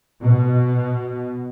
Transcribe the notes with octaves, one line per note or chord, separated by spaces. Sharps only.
B2